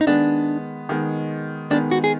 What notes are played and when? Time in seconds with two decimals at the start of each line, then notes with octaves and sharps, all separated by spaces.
0.01 D#4
0.07 D#3 G#3 B3 D4
0.89 D#3 G#3 B3
1.71 D#3 G#3 B3 D4
1.91 F#4
2.04 G#4